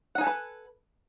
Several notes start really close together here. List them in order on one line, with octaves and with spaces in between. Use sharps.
F#5 D#4 G#5 A4 B4